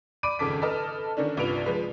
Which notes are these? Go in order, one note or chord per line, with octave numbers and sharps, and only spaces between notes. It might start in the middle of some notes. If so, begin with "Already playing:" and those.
D5 B5 D6 D7 D#7
G#1 F2 C#3 A4 D6 B6
A4 B4 D#5 A5 F6
D3 D#3 C#4 D4
C2 G2 F4 B4 D7 F7
F3 G#3 B4